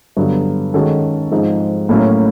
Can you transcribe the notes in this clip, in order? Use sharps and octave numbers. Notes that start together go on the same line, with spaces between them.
G2 D3 F#3 B3
D#3 G#3 C#4 F#4 A4
G#2 F3 G#3 C4 D#4
A2 F#3 A#3 C#4 E4